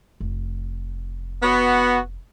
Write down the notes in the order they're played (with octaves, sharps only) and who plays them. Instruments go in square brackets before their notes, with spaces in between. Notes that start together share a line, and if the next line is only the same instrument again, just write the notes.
[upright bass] F1
[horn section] B3 F#4